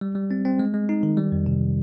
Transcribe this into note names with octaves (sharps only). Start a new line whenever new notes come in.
G3
G3
C4
C4
G#3
G#3
D#4
D#3
G3
F2
C3